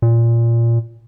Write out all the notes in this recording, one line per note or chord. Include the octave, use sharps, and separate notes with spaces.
A#2